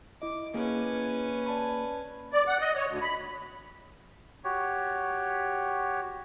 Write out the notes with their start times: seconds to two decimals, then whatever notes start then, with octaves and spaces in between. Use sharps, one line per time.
0.22 E4 D#5 D6
0.54 A#3 C#4 G#4 B4
1.46 D5 A5 B5
2.33 D5
2.47 F#5
2.60 D#5
2.75 C#5
2.88 D2
3.02 B5
4.44 F#4 G4 C#5